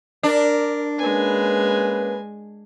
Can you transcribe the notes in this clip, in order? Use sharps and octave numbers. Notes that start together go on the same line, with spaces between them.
D4 A#4
G#3 A#3 C#4 B4 G#5